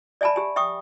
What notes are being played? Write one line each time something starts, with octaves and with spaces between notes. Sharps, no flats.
D5 E5 G#5 A5 B5
G4 G#5
E5 G5 C#6 D#6